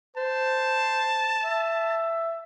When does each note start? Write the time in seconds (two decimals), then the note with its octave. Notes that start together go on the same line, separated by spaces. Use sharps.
0.16 C5 A5
1.43 E5